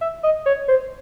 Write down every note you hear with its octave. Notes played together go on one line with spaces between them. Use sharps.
E5
D#5
C#5
C5